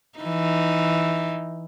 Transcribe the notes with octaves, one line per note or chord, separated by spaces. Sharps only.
E3 D#4